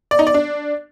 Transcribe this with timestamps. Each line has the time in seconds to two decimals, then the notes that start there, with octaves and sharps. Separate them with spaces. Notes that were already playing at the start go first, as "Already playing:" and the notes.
0.11 D5
0.19 D#4
0.27 D5
0.34 D4